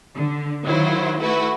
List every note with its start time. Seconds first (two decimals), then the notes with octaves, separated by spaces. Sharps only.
0.16 D3
0.65 D#3 F#3 E4 F4 C5
1.20 A3 E4 F#4 B4